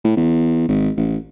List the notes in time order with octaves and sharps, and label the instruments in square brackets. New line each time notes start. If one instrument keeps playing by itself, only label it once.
[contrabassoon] A2
E2
G#1
A1